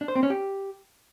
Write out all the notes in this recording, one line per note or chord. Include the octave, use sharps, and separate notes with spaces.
D4
C5
C4
C#4
G4